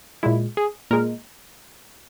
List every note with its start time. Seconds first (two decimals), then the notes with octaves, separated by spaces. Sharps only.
0.23 A#2 G#3 E4
0.57 G#4
0.91 A#2 G#3 A#4